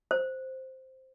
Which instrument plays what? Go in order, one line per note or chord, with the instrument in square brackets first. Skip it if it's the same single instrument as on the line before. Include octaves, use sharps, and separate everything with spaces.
[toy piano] C5